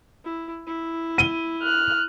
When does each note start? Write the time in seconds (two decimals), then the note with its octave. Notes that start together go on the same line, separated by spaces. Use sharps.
0.25 E4
0.67 E4
1.18 D#7 G7
1.62 F6 F#6